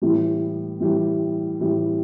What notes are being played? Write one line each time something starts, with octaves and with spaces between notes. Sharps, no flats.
A2 E3 G3
A2 E3 G3
A2 E3 G3